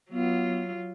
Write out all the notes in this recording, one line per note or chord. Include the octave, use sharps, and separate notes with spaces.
F#3 B3 F4